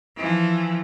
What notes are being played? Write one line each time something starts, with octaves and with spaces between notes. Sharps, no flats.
E3 F3